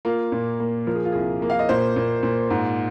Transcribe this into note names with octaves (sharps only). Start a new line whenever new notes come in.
A#3 F4
A#2
A#3
F3 A#4
G#4
F4
C2 G#4
A#3
F5
D#5
A#2 C5
A#2
A#2
G#2